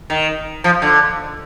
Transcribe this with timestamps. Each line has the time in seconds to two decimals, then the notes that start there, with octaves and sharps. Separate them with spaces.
0.10 D#3
0.64 F3
0.82 D3